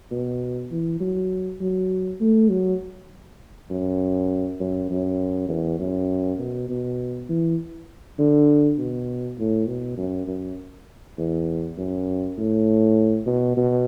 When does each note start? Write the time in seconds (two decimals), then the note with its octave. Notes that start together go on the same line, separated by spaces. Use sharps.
0.11 B2
0.71 E3
1.00 F#3
1.60 F#3
2.20 A3
2.50 F#3
3.70 F#2
4.60 F#2
4.90 F#2
5.49 E2
5.80 F#2
6.39 B2
6.69 B2
7.29 E3
8.18 D3
8.78 B2
9.39 A2
9.68 B2
9.98 F#2
10.27 F#2
11.18 E2
11.78 F#2
12.38 A2
13.26 B2
13.57 B2